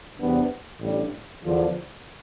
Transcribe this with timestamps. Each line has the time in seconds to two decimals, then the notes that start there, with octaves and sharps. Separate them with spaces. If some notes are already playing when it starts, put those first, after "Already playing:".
0.18 E2 C3 G3 B3 D4
0.80 A1 A2 G3 D4
1.43 E2 D3 F3